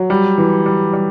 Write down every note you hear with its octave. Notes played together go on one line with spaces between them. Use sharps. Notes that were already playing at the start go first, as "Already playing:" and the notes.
Already playing: F#3
G3
E3
G3
G3